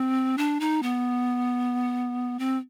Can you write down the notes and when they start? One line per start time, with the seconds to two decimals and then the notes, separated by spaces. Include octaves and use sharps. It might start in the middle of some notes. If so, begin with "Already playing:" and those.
Already playing: C4
0.38 D4
0.60 D#4
0.82 B3
2.39 C4